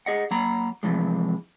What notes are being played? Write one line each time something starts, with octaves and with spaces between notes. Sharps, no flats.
G#4 D#5 F#5
F#3 A#3 A#5 B5
C3 E3 F3 G#3